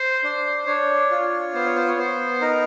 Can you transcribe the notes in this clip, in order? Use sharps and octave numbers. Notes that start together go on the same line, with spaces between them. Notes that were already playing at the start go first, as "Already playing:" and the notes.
Already playing: C5
D4
D4 C#5
F4
B3 C5
C#5
C5
C#5
B3 C5
D#4 A#4